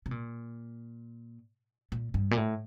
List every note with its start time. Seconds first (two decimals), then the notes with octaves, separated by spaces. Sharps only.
0.06 C3
0.11 A#2
1.92 A#2
2.14 G2
2.31 A#2
2.37 A2